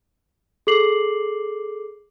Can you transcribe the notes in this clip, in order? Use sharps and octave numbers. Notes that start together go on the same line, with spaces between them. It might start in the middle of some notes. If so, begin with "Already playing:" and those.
G#4 A4 D6 C7 F#7